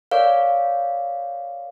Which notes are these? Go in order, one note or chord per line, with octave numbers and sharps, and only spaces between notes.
A#4 C#5 D5 F5